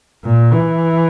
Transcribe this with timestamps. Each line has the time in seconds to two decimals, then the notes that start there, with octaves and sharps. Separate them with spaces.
0.24 A#2
0.53 E3